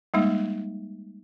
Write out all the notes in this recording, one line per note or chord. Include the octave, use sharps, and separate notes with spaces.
G3 G#3 A#3 D#4